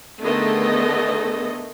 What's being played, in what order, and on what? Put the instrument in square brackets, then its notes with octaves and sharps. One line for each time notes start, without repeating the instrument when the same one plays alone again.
[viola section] D3 D#3 A3 B3 G#4 D#5